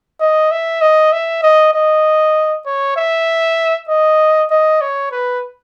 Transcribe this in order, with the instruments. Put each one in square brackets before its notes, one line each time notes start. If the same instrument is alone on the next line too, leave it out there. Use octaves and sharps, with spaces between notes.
[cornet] D#5
E5
D#5
E5
D#5
D#5
C#5
E5
D#5
D#5
C#5
B4